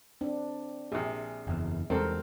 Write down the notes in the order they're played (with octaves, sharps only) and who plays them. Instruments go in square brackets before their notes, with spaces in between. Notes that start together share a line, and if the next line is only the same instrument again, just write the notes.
[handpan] C4 D4
[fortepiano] A#1 C3 [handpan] G#4
[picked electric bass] F#1 E2
[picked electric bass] E2 C3 G3 [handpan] G#3 A#4 [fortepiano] C4 A4